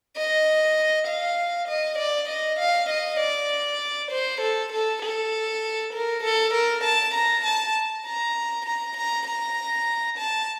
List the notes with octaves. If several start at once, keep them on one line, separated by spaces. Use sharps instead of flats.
D#5
F5
D#5
D5
D#5
F5
D#5
D5
C5
A4
A4
A4
A#4
A4
A#4
A5
A#5
A5
A#5
A#5
A#5
A#5
A5